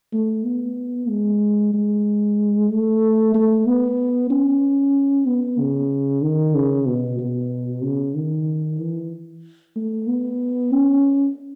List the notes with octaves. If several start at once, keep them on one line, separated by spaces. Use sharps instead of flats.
A3
B3
G#3
G#3
A3
A3
B3
C#4
B3
C#3
D#3
C#3
B2
B2
C#3
D#3
E3
A3
B3
C#4